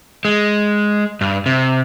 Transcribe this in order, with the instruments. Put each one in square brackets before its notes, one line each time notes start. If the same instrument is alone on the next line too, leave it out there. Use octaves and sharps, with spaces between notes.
[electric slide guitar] G#3
G2
C3